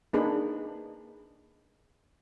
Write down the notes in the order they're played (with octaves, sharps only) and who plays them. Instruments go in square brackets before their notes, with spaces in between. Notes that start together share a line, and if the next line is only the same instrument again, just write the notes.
[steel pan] A#3 D4 D#4 G#4 B4 B5